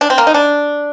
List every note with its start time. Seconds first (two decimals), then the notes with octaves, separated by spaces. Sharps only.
0.01 D4
0.10 C4
0.18 A#3
0.27 D#4
0.34 D4